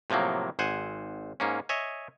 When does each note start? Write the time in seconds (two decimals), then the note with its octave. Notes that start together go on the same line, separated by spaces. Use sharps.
0.10 A2 C3 F3 F#3 A#3
0.59 G#1 C5 F#5 G#5
1.40 G#2 A#3 C#4
1.69 C#5 D#5 E5 G#5